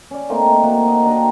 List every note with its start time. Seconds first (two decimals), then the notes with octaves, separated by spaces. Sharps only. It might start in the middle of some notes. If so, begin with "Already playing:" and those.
0.11 C#4 D5
0.29 A3 A#3 C4 D#4
0.63 A#3 F#4
0.88 D#5
1.04 D4 G4 A#4 A#5